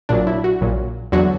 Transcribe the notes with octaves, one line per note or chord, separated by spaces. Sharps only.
A#1 A#2 F#3 D4
E4
F#4
A#1 A#2 F#3
E2 D3 F#3 F#4